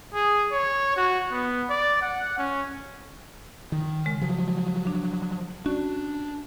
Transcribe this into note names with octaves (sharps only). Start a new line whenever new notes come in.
G#4
C#5
F#4
B3
D5
F#5
C#4
D#3
C#3 G#3
F3 F#3
D4
C#4 D4 F#4 D5